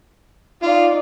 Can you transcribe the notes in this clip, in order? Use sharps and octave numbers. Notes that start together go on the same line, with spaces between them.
D#4 F4 D5